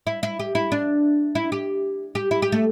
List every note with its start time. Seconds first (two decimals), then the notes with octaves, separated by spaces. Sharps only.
0.07 E4
0.23 E4
0.40 G4
0.55 E4
0.72 D4
1.35 E4
1.52 G4
2.15 G4
2.31 E4
2.42 G4
2.52 A3